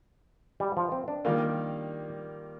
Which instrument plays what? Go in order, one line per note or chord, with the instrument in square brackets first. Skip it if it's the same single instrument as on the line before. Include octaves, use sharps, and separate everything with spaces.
[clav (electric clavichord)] G3
F3
C4
D4
[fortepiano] D#3 G3 A#3 F4